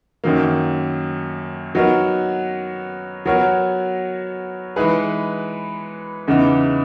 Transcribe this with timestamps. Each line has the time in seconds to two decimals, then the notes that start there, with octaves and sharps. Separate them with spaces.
0.24 F#2 D#3 F#3 A#3
1.75 F#3 B3 D#4 F#4 A#4
3.26 F#3 B3 F#4 A#4 C#5
4.76 E3 G#3 D#4 G#4 B4
6.27 E2 C#3 E3 B3 D#4